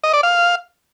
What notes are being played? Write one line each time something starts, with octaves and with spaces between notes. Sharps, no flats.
D#5
D5
F5